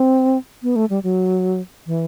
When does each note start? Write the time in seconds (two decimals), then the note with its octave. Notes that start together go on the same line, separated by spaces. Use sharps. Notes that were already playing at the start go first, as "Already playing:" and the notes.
Already playing: C4
0.63 B3
0.76 A3
0.90 G3
1.03 F#3
1.87 E3